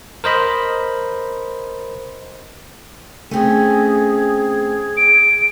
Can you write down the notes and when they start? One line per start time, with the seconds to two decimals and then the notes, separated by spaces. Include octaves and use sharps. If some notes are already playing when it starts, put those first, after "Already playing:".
0.24 A#4 C5 D#5 B5
3.31 A3 C4 C#4 G#4
4.97 D7